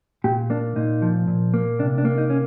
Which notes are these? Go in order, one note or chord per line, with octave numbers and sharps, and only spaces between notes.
A#2 G4
A#3 D4
A#2 D#4
F3
A#2
A#3
C3 D4
D4
A#3
D#4
C#4